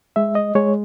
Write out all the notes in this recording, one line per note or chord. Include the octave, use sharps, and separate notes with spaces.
G#3 E5
D#5
G#3 C#5